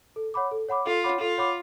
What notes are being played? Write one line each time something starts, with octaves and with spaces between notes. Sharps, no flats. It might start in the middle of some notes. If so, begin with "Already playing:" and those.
A4
C#5 F#5 B5 D6
A4
C#5 F#5 B5 D6
F4 A4
C#5 F#5 B5 D6
F4 A4
C#5 F#5 B5 D6